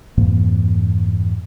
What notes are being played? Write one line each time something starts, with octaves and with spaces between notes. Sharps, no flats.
F2 G#2 E3 A#3